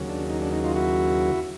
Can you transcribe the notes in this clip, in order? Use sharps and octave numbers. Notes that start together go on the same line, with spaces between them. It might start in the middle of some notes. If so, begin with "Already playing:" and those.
Already playing: D#2 C#3 F#3
D4
D#4
D4
D#4
D#4 F4
E4 F#4